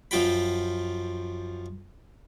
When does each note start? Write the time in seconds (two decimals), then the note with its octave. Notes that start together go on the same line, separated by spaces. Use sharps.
0.11 F#2 F3 F4 G5 B5